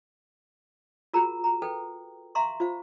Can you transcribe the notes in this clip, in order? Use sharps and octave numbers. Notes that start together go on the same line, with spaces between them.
F4 F#4 G#4 A#4 A#5
A#5
A4 B4 G5
E5 F5 A#5 C6 C#6
F4 C5 F5